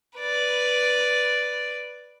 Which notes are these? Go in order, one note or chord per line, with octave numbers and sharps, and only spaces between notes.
B4 D5